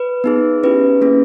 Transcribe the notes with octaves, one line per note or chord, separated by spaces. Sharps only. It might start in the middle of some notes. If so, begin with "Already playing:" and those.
Already playing: B4
B3 D#4 G#4
C#4 E4 G4 B4
A#3 C#4 E4 G#4